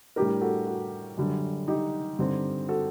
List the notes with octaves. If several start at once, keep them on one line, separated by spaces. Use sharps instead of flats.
A2 G3 D4 G4 A#4
F#4 A4
F#4
F#2 D3 G3
D#4 G4
G2 D3 G3 C4
F#4 A4